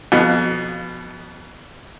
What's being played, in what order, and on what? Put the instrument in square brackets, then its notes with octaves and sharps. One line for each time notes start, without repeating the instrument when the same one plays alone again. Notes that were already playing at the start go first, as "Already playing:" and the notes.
[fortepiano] F2 B2